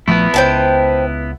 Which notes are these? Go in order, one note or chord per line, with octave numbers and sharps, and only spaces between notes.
A#1 F3 A3 B3 E4
C#2 C5 G5 A5